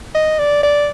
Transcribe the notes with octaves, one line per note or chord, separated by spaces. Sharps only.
D#5
D5
D5